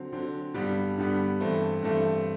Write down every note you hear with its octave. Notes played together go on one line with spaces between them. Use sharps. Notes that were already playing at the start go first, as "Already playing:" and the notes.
Already playing: D3 F#3 C4
D3 F#3 C4
G2 D3 G3 B3
G2 D3 G3 B3
G2 E3 A3 C4
G2 E3 A3 C4